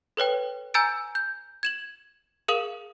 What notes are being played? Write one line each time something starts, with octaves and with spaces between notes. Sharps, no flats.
A4 B4 C#5 G5
G#5 A#5 E6 G6 A6 D7
G6
G#6 E7 F#7
G#4 A#4 F5 D#6 E7 F#7